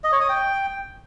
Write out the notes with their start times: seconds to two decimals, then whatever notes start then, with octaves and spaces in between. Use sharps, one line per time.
0.04 D#5
0.12 C#5
0.21 D#6
0.29 G5